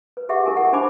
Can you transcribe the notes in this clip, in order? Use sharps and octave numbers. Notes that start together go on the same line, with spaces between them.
B4
G4 G#4 E5 F#5 C#6
E4 A#4 G#5
F#5
D4 D#4 C5 G#5 B5 D6